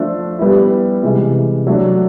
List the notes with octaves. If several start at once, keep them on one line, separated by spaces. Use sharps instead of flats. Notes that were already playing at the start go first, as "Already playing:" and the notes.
Already playing: F3 A3 D4
G3 B3 E4
C3 E3 G#3
F#3 A3 D4